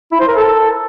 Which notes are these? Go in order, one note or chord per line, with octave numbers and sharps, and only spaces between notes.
E4
C5
A#4
A4